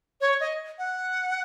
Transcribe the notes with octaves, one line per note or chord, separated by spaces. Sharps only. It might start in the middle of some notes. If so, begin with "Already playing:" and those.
C#5
D#5
F#5